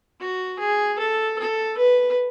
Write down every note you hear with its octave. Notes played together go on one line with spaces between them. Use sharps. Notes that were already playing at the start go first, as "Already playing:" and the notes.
F#4
G#4
A4
A4
B4